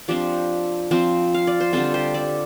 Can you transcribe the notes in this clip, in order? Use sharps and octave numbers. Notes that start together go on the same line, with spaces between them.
F3 C4 D4 G4
F3 C4
F5
D5
C5
D3 G3 C4 F4 A4
G4 C5
A4 D5